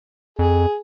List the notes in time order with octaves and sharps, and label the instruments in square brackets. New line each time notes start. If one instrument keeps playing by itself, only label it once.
[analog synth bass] F2 [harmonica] G#4